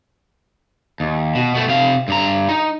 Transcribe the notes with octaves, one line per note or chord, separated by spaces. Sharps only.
D#2
B2
B2 A3
C3 F5
G2 A#5
D#4